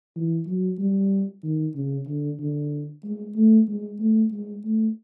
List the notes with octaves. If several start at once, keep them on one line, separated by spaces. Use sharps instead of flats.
E3
F#3
G3
D#3
C#3
D3
D3
G#3
A3
G#3
A3
G#3
A3